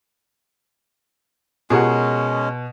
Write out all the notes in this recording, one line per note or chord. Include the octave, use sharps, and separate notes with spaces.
B2 G#3 C#4 F4 G4 G#4 A#4 F#5